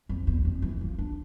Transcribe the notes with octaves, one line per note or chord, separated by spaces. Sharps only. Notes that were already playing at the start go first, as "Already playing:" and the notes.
F2
E2
F2
E3
F3
D4